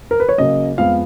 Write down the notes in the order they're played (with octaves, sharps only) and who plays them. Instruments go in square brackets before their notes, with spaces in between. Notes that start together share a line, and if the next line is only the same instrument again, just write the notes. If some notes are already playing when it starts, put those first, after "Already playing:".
[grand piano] A#4
B4
C#5
C#3 F#3 A#3 D#5
F2 F3 G#3 B3 F5